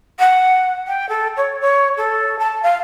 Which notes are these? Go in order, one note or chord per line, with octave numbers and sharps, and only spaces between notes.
F#5
G5
A4
C#5
C#5
A4
A5
F5